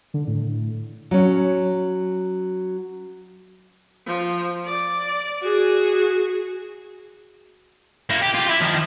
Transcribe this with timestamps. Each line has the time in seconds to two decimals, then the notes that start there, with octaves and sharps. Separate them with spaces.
0.14 D3
0.27 A2
1.11 F#3 C#4
4.06 F3
4.65 D5
5.42 F#4 G#4
8.10 A#3 E4
8.22 G4
8.35 F4 G4
8.49 E4
8.61 D#3 F3